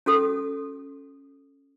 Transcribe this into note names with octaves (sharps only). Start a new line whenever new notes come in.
C#4 F#4 A4 D#6